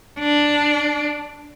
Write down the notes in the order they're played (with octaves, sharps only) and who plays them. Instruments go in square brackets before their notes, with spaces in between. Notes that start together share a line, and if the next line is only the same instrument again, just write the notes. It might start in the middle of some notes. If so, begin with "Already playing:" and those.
[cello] D4